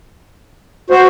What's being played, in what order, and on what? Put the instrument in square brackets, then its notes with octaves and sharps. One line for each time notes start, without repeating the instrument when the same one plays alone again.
[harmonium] F#4 [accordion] C5